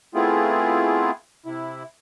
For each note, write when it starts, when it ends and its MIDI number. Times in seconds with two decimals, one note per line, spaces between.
0.15 1.11 57
0.15 1.11 59
0.15 1.11 60
0.15 1.11 64
0.15 1.11 65
0.15 1.11 68
1.46 1.83 48
1.46 1.83 64